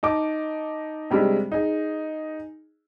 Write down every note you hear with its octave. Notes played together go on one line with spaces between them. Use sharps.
D#4 A5 D6
C3 G3 G#3 D4
D#4 G#4